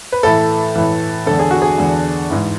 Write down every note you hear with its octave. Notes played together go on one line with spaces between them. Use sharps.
B4
A2 E3 A4
A2 E3
E2 D3 A4
G#4
F#4
G#4
E2 D3
G#2 E3